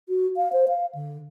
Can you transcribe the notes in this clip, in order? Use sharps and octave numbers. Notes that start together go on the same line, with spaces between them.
F#4
F5
C5
F5
D3